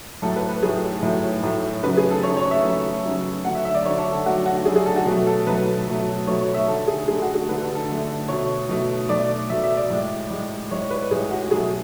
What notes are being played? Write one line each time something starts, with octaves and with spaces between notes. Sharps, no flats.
A2 F#3 A3 A4
B4
B4
A2 F#3 A3 G#4
A2 F#3 A3
A2 F#3 A3
C#3 F#3 A3 B4
G#4
A4
C#3 F#3 A3 C#5
C#5
E5
C#3 F#3 A3
C#3 F#3 A3
D3 F#3 A3 F#5
E5
E5
D5
D3 F#3 A3 C#5
A4
A4
D3 F#3 A3 F#4
F#4
D3 F#3 A3 G#4
G#4
A4
F#4
B2 F#3 A3
A4
B2 F#3 A3 B4
B2 F#3 A3
B2 F#3 A3 C#5
C#5
E5
D3 A3 A4
G#4
D3 A3 G#4
F#4
G#4
D3 A3 B4
A4
A4
D3 A3
B2 A3 C#5
B2 A3
B2 A3 D5
B2 A3 E5
E5
D5
A2 G#3
A2 G#3
A2 G#3 C#5
B4
A2 G#3 G#4
F#4
B2 F#3 A3 G#4